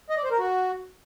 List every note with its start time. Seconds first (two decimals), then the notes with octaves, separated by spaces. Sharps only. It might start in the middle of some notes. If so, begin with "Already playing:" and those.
0.10 D#5
0.17 D5
0.24 C5
0.31 A#4
0.39 F#4